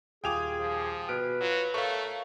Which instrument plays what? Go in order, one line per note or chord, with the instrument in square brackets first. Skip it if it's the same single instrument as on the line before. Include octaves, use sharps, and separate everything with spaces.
[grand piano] D#1 F4 F7 [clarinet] G#4 [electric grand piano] G5 G#5 D6
[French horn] F3
[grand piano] B2 F6 D7 [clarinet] B4
[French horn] F#3 [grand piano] F4
[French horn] A3 [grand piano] A4 A#4 C#5 [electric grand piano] F5 C#6